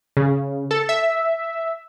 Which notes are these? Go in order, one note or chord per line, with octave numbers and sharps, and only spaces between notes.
C#3
A4
E5